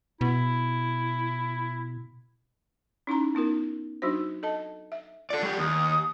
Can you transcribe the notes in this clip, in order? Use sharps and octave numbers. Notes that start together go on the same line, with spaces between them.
B2 E4
C#4 D#4 E4 A#5
B3 D#4 F4 A#4
F#3 D4 D#4 F#4 C5
A4 D#5 A5
E5
F4 A4 D5
F#3 G4
D#2 D#6